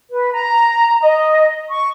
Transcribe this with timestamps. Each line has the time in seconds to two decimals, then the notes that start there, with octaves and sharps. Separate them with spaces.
0.10 B4
0.32 A#5
1.01 D#5
1.70 C#6